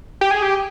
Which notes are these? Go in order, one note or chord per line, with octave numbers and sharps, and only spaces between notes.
G4
G#4
G4